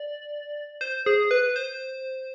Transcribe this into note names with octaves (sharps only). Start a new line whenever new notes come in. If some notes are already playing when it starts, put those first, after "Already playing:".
Already playing: D5
C5
G#4
B4
C5